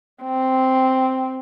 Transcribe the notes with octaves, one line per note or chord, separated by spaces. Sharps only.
C4